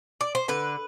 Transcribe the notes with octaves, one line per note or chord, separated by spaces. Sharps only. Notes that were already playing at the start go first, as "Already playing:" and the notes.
D5
C5
D3 B4